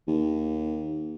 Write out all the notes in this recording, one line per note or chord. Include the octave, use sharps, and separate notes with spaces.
D#2